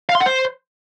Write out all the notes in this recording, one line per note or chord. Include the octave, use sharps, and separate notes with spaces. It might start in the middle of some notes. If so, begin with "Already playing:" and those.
F5
C6
F#5
C5